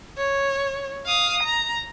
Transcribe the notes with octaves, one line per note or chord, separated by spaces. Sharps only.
C#5
F5 D#6
A#5